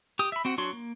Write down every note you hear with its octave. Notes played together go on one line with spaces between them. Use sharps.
G4 D#6
E5 B5
C4 F#4 F#5
F#3 D4 F#4 C#5 C6
A#3